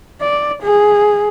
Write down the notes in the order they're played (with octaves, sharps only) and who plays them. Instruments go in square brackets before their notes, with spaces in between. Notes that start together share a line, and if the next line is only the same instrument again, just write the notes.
[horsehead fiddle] D5
G#4